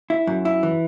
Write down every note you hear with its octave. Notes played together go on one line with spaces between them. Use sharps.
E4
F#2
E4
E3